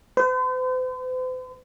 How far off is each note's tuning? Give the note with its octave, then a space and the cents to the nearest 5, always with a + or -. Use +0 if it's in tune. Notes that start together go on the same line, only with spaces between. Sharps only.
C5 -45